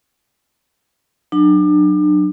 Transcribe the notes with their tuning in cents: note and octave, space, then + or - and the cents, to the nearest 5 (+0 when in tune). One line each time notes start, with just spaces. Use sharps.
F#3 +0 D4 +35